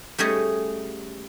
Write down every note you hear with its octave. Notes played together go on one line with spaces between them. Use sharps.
G3 A3 C#4 G#4 C#5 D#5